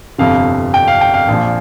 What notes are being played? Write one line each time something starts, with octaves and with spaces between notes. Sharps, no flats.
G1 F2 C3 F5
G5
F5
G5
F5
A#1 A#2 F3